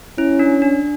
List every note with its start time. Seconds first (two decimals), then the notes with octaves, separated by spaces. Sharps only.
0.18 C#4 E4
0.39 D4
0.62 D4